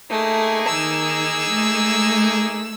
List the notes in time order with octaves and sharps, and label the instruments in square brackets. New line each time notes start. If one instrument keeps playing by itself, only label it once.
[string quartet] A3 [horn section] A#3 D#4 G#4
[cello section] D#3 [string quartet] E6
[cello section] A3